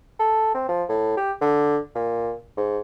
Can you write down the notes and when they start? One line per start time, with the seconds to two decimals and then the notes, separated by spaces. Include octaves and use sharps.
0.20 A4
0.55 C4
0.69 F3
0.89 A2
1.17 G4
1.41 D3
1.95 A#2
2.57 G#2